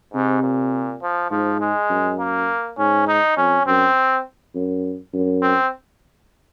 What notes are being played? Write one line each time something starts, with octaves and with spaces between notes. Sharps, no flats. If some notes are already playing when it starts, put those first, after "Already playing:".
G#2 C3
A#2
F3
G#2 F3
G#3
F#2
A#3
G#2 C#4
D#4
F2 C#4
F#2 C4
F#2
F#2
C4